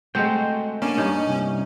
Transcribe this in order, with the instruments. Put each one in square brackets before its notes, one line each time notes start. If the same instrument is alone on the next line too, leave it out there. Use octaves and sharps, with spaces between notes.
[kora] G#3 C4 [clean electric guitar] A3 F#4 G5
[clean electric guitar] A#3 D4 [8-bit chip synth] C#4
[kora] G2 D#4 C#5
[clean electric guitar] C2